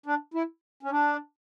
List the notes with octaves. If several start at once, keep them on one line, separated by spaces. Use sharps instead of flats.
D4
E4
C#4
D4